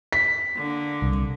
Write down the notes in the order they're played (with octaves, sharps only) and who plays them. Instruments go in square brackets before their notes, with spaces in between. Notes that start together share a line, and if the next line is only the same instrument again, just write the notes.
[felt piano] B6
[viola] D3 A#3
[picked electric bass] C2